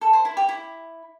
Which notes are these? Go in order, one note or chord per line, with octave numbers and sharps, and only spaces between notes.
A4
C5
E4
G4
E4